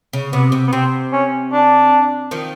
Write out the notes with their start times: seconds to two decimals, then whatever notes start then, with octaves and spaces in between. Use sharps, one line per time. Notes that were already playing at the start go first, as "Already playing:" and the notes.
0.13 C#3
0.33 C3 B3
0.52 C3
0.67 B3
0.72 C3 C4
1.13 C#4
1.52 D4
2.31 D#3 F3